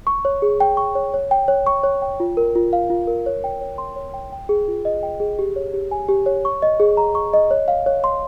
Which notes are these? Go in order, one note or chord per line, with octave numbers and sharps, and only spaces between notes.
C#6
C#5
G#4
G5
C#6
C#5
C#5
G5
C#5
C#6
C#5
G5
F4
A#4
F4
F5
F4
A#4
C#5
G5
C#5
C6
C#5
G5
G5
G#4
F4
D#5
G5
G#4
G4
C#5
G4
G#5
G4
C#5
C#6
D#5
G#4
A#5
C#6
D#5
C#5
F5
C#5
C6